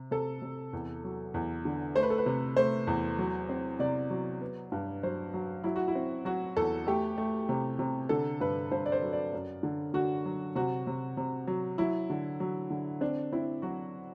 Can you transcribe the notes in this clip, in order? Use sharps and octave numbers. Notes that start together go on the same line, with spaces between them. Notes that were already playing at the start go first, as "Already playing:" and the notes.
Already playing: C3
C3 A4
C3
E2
F#3
E2
D3
A3 C5
B4
A4
B4
C3
A3 C5
E2
F#3
C4
C3 D5
F#3
B3
G2
F#3 C5
F#3
F#3 E4
F#4
E4
C4
F#3 F#4
E2 A4
A3 G4
A3
C3
C3
D3 A4
G2 B4
G2 C5
D5
C5
F#3
D5
F#2
D3
D3 F#4
F#3
C3 F#4
C3
C3
F#3
F#3 E4
D3
F#3
D3
C4 D4
C4 E4
F#3 F#4